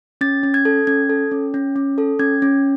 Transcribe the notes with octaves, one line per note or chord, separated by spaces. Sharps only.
C#4 A6
C#4
G#6
A4
C#4 G#6
A4
C#4
C#4
C#4
A4
C#4 G#6
C#4